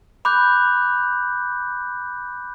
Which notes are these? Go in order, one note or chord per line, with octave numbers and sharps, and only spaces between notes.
B5 D6 F#6 G6